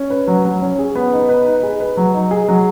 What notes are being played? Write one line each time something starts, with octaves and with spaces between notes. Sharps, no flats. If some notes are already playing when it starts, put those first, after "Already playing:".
Already playing: C#4
B4
F#3
F#3
C#4
G#4
B3
D#4
B4
D#4
G#4
B4
F#3
D#4
G#4
F#3